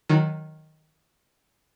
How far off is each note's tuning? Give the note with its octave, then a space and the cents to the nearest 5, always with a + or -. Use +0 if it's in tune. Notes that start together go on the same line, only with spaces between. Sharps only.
D#3 +0 F#3 -15